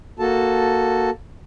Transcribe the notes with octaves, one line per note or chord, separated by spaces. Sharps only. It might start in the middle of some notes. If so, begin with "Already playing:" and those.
A#3 F#4 A4 A5